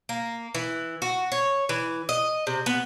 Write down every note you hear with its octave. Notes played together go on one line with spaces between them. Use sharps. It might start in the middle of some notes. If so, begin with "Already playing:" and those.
A#3
E3
F#4
C#5
E3
D#5
C3
B3